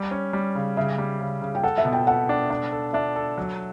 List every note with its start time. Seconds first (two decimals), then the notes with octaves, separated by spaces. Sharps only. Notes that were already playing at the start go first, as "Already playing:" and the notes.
Already playing: G3 D5
0.11 C#4
0.33 G3
0.55 C#3
0.77 C#3 E5
0.98 G3
1.21 C#3
1.42 C#3
1.55 G5
1.63 A4 F#5
1.78 E5
1.85 B2
1.92 G5
2.07 A4 F#5
2.29 D4
2.50 D4
2.72 A4
2.93 D4 E5
3.16 A4
3.38 F#3